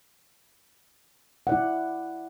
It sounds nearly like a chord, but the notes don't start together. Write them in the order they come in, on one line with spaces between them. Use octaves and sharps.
F#5 D5 E4